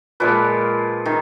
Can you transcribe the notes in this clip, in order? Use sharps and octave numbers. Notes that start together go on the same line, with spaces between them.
A#2 F3 G#3 B4
D#3